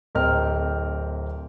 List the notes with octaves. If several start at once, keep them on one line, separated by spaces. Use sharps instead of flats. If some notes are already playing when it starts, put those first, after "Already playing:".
D1 C4 A#4 D#5 G5 F6